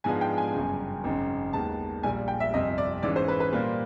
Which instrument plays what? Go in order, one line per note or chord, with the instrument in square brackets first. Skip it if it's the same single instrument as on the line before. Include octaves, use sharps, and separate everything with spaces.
[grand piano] G#2 F3 G#3 B3 D4 [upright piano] G#5
[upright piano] G5
G#5
[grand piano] G1 F#2 C#3
G#1 F#2 C#3
[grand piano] D#2 D#3 G#3 B3 [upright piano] A5
[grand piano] A#1 A#2 G3 [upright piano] G#5
[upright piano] G5
E5
[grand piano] G1 F2 C3 [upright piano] D#5
[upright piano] D5
[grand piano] G#2 E3 G#3 C#4 [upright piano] D5
[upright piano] C5
B4
B4
[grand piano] A#2 G3 A#3 [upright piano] B4